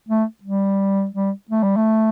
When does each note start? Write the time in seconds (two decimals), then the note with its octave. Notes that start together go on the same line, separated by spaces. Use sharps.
0.08 A3
0.43 G3
1.15 G3
1.50 A3
1.63 G3
1.77 A3